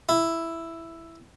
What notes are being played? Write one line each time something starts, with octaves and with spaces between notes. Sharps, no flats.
E4